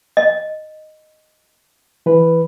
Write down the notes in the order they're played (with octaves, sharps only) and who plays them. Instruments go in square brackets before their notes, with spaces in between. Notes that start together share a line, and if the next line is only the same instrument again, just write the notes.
[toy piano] D#5
[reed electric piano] E3 B4